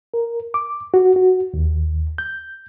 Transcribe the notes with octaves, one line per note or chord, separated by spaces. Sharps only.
A#4
D6
F#4
F#4
D#2
G6